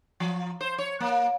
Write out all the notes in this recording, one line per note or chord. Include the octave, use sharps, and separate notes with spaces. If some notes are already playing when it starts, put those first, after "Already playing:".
F3
C5
C#5
A#3